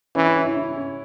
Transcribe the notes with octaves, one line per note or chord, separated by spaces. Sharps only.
E3 C#4
E4
C#4
E4
E4
C#4